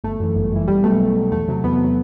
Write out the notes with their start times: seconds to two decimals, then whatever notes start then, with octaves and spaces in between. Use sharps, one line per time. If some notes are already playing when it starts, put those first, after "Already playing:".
0.04 G1 A3
0.20 F#2 E3
0.36 G1
0.52 F#2 E3
0.68 B1 G3
0.83 B2 F#3 A3
1.00 B1
1.15 B2 F#3
1.32 E2 A3
1.48 C3 F#3
1.64 E2 B3
1.79 C3 F#3